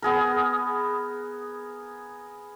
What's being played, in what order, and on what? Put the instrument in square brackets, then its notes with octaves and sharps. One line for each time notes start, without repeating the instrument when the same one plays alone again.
[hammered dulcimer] B3 G#4 A#4